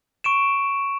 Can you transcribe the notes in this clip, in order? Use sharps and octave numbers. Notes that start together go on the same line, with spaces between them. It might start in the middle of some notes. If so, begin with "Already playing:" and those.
C#6 D7 E7